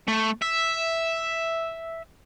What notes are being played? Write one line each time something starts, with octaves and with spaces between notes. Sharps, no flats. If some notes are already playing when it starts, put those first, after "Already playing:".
A3
E5